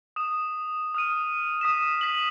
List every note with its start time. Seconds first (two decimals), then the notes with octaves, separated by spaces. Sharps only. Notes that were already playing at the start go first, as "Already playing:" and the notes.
0.16 D#6 E7
0.95 D#6 F6 D#7
1.61 D#6 B6 E7
2.01 B6 F#7